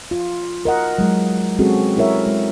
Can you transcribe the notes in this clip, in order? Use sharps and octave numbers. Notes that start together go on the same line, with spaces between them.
F4
A#4 D#5 F#5
F#3 G#3
G#3 C4 C#4 F#4 G#4 A4
E4 A4 A#4 C#5 E5
G#3